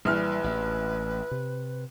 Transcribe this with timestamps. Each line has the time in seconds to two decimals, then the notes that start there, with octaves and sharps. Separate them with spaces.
0.05 A#1 E3 G3 B4 F6
0.44 A1
1.31 C3